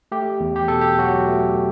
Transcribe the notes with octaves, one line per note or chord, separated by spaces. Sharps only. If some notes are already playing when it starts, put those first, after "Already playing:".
A3 G4
E2
G4
B2 A4
G4
F#3 F#4
A3